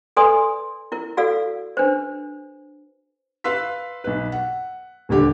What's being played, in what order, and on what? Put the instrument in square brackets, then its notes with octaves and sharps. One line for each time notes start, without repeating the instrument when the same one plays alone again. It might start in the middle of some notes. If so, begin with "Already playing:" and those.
[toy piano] A4 B4 D5 G#5 C6 D#6
E4 A#4
F#4 A4 D5 F5 E6
D4 B4 C5
[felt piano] B4 F5 C6 E6 B6
B1 B4
F#5
D#1 D2 D3 G4